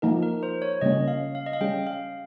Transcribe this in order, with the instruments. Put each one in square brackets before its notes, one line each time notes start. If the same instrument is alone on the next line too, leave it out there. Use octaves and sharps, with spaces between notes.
[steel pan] F3 A#3 D#4 [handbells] A#4
[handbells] A#4
C5
C#5
[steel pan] C#3 G3 A#3 C#4 [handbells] D#5
[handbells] F5
F5
D#5
F5
[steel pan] G3 C#4 G#4 [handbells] G5
[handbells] F5